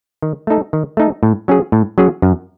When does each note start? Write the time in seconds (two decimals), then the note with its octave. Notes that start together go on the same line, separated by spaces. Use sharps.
0.22 D#3
0.47 A3 D#4 A4
0.73 D#3
0.97 A3 D#4 A4
1.23 A2
1.48 F#3 C#4 G#4
1.72 A2
1.98 F#3 C#4 G#4
2.22 F#2